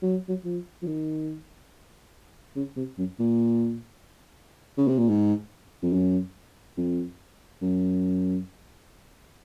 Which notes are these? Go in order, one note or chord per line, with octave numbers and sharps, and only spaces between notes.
F#3
F#3
F3
F3
D#3
C#3
C3
F#2
A#2
C#3
C3
A#2
G#2
F2
F#2
F2
F#2